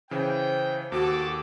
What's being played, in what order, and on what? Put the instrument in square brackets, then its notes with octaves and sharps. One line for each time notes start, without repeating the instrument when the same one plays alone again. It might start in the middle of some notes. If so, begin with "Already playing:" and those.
[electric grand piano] C#3 E3 [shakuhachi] C5 [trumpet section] G5
[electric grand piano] D#2 [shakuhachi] F#4 [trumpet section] A4 D6